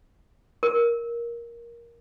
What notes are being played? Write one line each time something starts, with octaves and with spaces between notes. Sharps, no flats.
A#4